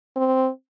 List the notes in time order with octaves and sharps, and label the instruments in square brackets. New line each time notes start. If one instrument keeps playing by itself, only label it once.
[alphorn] C4